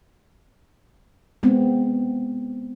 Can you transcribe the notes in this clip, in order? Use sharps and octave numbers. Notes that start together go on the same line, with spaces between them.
G#3 B3 C4